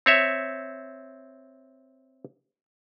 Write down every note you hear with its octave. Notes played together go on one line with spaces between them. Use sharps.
C4 C#5 E5